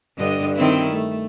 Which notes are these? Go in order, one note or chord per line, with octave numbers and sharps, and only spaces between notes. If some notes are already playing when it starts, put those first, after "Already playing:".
G2 D3 D#5
D#3 C4 E4
A3